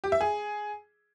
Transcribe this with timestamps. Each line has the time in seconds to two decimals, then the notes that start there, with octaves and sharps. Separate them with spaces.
0.04 G4
0.12 E5
0.21 G#4